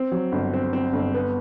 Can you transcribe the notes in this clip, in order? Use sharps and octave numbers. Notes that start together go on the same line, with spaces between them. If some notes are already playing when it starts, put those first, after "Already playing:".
Already playing: C4
F#3
G1
C4
C4
G1
B3